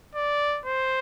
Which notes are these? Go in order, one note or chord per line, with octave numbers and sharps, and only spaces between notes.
D5
C5